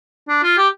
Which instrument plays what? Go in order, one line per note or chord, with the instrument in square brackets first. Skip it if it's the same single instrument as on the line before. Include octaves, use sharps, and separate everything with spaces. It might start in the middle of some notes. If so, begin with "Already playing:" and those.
[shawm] D4
F4
G4